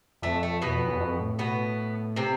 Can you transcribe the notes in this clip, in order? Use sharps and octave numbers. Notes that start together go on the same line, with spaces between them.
F2 A3
A3
E2 B2 B3
F2
E2
F2
A2
B2 B3
C3 C4